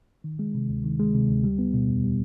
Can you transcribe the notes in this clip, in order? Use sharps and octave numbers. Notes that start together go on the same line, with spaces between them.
D#3
G#3
C3
D2
D#3
G#3
C3
D2
G3
B3
B2
E2
G3